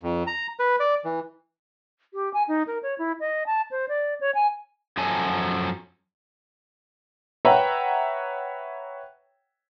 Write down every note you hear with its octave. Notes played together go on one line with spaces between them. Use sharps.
F2
A#5
B4
D5
E3
G4
G#5
D#4
A#4
C#5
E4
D#5
A5
C5
D5
C#5
G#5
F#2 F3 F#3 A4 G#5
B4 C#5 E5 F#5 G5 A#5